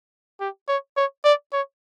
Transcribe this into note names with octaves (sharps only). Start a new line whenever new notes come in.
G4
C#5
C#5
D5
C#5